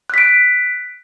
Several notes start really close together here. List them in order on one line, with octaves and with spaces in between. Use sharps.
F#6 B6 D7